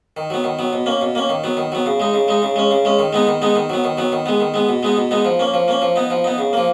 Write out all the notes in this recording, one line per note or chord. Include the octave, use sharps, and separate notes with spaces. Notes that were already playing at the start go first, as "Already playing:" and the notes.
D#3
F#3 B3
D#3
F#3 B3
B2
A#3 C#4
B2
A#3 C#4
D#3
F#3 B3
D#3
F#3 B3
C#3
G#3 D#4
C#3
G#3 D#4
C#3
G#3 C#4
C#3
G#3 C#4
D#3
G#3 B3 D#4
D#3
G#3 B3 D#4
D#3
F#3 B3
D#3
F#3 B3
D#3
G#3 B3
D#3
G#3 B3
B2
G#3 B3 D#4
B2
G#3 B3 D#4
F3
A#3 C#4
F3
A#3 C#4
F3
B3 D#4
F3
B3 D#4
C#3
F3 A#3